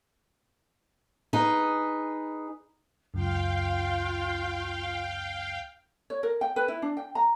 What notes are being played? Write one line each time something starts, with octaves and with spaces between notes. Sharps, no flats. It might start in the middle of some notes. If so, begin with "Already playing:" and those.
D#4 G#4 B4
C#2 F#2 F4 F5 G5
C#5
A#4
G5
B4
E4
D4
G5
A#5